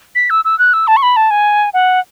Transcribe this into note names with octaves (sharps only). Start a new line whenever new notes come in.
B6
E6
E6
F#6
E6
A5
C#6
B5
A5
G#5
F#5